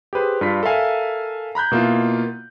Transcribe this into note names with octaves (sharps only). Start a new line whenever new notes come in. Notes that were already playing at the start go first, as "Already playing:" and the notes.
G4 G#4 B4 C5
G2 F4 B6
A4 A#4 E5 F5 G#5
A#5 B5 F#6 G6
B2 A#3 E4 F4